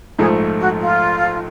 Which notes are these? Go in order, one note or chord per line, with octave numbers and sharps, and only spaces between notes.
A#1 G#2 F3 A3 G#4
F#4
F4